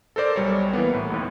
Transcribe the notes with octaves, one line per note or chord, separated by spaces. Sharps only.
A4 A#4 C5 D5
B1 G3 C#5
E3 A#3 B3
A2
A1 D#2 A2